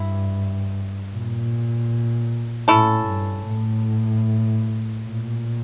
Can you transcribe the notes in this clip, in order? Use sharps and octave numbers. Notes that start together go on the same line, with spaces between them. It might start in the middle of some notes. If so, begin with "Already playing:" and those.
Already playing: G2 E4
A#2
A2 C#4 E4 A4
G2
A2
A#2